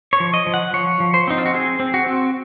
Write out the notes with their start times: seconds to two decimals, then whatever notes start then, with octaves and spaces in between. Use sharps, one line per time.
0.13 C#5
0.20 F3
0.34 D#5
0.47 F3
0.54 F#5
0.73 F3 C#5
1.00 F3
1.14 C5
1.27 C4 D#4
1.38 F4
1.46 F#4
1.54 C4 G#4
1.80 C4
1.94 F#4
2.07 C4